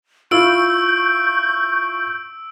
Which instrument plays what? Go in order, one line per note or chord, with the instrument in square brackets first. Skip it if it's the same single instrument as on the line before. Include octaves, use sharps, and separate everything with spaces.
[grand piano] E4 F4 [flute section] C#6 G6 [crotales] E6 D7